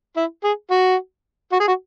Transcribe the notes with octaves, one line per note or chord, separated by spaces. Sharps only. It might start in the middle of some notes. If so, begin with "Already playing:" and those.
E4
G#4
F#4
F#4
G#4
F#4